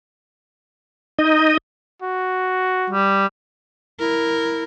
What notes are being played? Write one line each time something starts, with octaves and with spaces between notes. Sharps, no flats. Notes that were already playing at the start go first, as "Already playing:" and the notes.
D#4 D#5
F#4
G3
E4 A#4